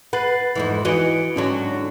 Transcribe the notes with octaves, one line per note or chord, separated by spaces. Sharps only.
B4 F#5 A6 C7
F2 G#2 E3
E3 F#4 D#5 C#7 D7
G#2 D3 F#3 C#4